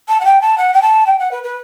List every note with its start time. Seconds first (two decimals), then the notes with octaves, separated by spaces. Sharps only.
0.08 A5
0.20 F#5
0.25 G5
0.41 A5
0.58 F#5
0.74 G5
0.82 A5
1.06 G5
1.19 F#5
1.31 B4
1.44 B4